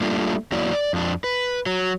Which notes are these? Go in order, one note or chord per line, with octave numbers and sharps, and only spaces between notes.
G3 A3 A#3 D4 F4
E2 F#3 A#3 E4 D5
D5
F2 D4
B4
F#3